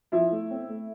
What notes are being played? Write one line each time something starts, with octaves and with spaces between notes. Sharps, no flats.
F3 E4 E5
A3
C4
A3